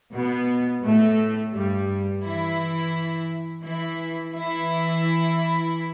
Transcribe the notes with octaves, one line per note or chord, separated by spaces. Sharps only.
B2 B3
A2 A3
G2 G3
E3 E4
E3 E4
E3 E4